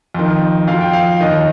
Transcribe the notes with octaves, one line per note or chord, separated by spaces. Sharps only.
F2 D#3
F2 F3 F5
G5
F5
D#2 D#3 D#5